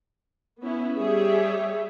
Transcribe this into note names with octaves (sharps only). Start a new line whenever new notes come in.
B3 C#4 E4
G3 G4 G#4 C#5 E5